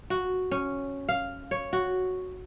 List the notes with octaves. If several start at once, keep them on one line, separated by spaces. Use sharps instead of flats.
F#4
C#4
F5
C#5
F#4